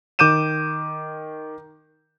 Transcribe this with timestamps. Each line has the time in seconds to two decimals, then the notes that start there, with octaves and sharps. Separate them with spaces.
0.19 D#3 D6 G6 D#7 E7